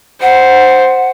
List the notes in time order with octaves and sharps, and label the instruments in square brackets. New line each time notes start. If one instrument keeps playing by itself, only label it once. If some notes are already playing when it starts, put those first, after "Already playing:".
[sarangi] C5 [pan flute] F#5